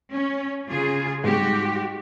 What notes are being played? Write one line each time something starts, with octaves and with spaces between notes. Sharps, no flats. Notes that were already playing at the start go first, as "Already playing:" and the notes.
C#4
C#3 F4 G#4
G#2 G3 F#4 G4